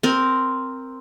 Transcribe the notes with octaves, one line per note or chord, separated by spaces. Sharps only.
C4 A#4